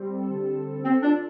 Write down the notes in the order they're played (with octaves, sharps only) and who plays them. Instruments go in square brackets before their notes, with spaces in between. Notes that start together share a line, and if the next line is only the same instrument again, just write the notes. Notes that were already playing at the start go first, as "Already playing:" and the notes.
Already playing: [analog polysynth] G3 C4
A4
D3
C4
G3
[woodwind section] C4 [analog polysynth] A4
[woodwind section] D4 [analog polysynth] F4